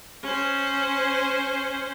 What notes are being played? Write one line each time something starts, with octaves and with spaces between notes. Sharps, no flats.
C#4 C5